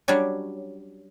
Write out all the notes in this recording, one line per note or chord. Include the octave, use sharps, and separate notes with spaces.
F#3 G3 C#4 D4 C#5